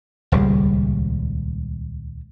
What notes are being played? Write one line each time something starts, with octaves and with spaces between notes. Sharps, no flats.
D#1 C#2 G3 G#3